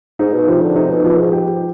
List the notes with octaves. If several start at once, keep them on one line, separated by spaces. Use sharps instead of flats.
G#2 D#4
B2
C3 F3
D3
C3 D#4
B2
B2 F3
G#2
G4